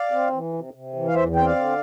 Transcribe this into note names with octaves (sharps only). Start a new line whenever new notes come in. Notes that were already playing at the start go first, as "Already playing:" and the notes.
Already playing: D5 F5
C4
E3
C3
C3
E3
F5
E2 C5 E5
C4 G5
D5 F5
D3